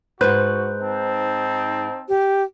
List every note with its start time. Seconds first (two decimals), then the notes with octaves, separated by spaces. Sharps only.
0.21 G#2 F#4 B4 C5 F#6 G6
0.81 C4 D#4 A5
2.09 G4